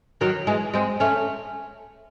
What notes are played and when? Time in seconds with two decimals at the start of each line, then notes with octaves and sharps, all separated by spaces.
0.21 D#3 F#3
0.47 E3 G#3
0.74 G#3 C4
1.00 A3 C#4